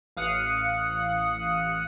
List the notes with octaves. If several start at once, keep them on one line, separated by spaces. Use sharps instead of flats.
A1 F5 D#6 F#6 C#7